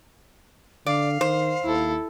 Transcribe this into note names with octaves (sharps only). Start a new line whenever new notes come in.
D3 D5 F5
D#3 C5
D#2 E4 A4